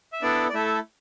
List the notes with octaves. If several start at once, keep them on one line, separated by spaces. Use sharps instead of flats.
E5
B3 D4 E4 A4 D5
D5
A3 E4 A4 E5